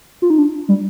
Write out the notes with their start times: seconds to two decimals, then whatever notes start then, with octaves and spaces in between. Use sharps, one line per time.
0.22 F4
0.30 D#4
0.38 D4
0.69 G3